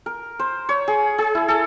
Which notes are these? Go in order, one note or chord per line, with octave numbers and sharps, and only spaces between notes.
A#4
C5
C#5
G#4
G#4
E4
A4